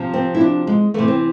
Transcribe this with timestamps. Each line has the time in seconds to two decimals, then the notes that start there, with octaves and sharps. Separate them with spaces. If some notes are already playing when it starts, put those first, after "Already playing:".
Already playing: C3 F3
0.14 C4
0.35 E4
0.41 D4
0.67 G#3
0.94 C3 E3 A3
1.08 C4